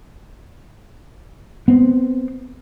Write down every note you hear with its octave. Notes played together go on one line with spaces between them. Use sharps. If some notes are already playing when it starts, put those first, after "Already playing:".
B3 C4